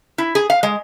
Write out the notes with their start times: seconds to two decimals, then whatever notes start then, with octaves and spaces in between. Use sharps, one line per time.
0.18 E4
0.35 G#4
0.50 F5
0.63 G#3